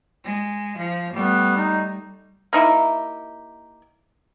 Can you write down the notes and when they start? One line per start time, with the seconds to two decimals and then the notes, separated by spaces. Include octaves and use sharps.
0.24 G#3
0.77 F3
1.13 G3 A3 B3
1.57 D#4
2.53 A#3 D#4 E4 G4